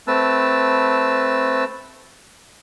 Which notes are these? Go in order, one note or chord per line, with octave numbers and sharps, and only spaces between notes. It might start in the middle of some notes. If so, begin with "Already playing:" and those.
A3 C4 B4 A5 E6